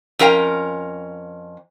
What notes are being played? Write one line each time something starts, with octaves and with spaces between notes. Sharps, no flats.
F2 C#4 A#4 F5 G5